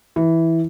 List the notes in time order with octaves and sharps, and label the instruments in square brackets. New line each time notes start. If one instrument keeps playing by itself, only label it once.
[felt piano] E3